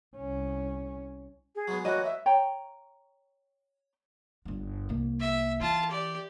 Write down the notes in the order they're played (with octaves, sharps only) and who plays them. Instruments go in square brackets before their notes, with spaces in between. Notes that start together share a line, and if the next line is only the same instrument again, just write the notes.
[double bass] C2 C#4
[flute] G#4
[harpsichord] F#3 G#3 B3
[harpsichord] A2 E3 A#3 [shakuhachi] F#4 [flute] C#5 [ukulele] D#5
[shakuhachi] E5
[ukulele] C#5 G5 A#5
[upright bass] G1 G2
C2 A#3
[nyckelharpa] E5
[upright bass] E3 [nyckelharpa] F4 A5
[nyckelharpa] G4 D5